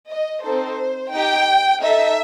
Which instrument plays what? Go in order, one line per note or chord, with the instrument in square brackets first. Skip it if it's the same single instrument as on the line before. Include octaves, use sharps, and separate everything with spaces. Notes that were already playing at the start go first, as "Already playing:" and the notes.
[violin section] D#5
C4 D#4 A4 C5
D#4 G4 G5
D#4 A4 E5